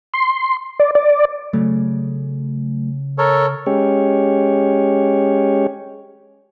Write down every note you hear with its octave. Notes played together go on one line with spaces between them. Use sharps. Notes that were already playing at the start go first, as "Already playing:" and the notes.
C6
D5
D5
C#3 F#3 A3
A4 A#4 C#5
G#3 C#4 G4 C#5